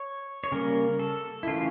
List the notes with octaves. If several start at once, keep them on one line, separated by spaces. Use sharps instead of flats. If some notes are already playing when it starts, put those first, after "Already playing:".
Already playing: C#5
C#5
C#3 G3 A#3 A#4
A4
E4
C#3 E3 A3 C#4 F4